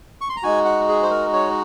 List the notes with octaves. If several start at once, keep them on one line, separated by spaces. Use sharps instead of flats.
C#6
C6
A#5
G#3 D#4 F#4 G#5
F#5
G#4
C5
A#4
C#5